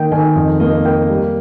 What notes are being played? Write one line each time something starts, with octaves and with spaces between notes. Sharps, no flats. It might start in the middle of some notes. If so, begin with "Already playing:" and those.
Already playing: D#3 A#3 G5
D#3 G#5
F2 D#5
A#3 D#5
A#3 G5
G3